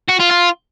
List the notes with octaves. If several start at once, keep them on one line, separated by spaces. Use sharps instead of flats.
F#4
F4
F4